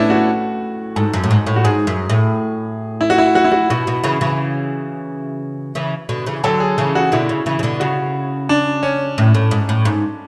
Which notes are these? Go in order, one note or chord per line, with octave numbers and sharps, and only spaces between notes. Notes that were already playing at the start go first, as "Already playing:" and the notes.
Already playing: A2 A3 B3 C#4 D4 E4
F#4
G#2 A4
F#2
A2
G#2
A2
F#4
G#2 G#4
F#2
A2
E4
F#4
E4
F#4
E4
F#4
B2 F#4
B2
C#3 E3
C#3 E3
C#3 E3
B2 D3
C#3 E3
D3 F#3 A4
G#4
C#3 E3 G#4
F#4
B2 D3 E4
C#3
C#3 E3
C#3
B2 D3
C#3 F#4
D4
C#4
A2
A2
G#2
A2
G#2